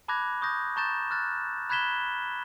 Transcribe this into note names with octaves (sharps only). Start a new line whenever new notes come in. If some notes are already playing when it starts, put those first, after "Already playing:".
A5 B5 D6 F#6 G#6 A#6
C#6 D#6 G6 A#6
A5 A#5 C#6 G6 A6 E7
F6 F#6 A6
B5 F#6 G#6 B6 E7 G7